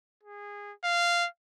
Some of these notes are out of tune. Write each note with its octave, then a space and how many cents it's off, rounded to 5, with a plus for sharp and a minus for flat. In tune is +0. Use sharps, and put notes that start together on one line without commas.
G#4 -20
F5 -10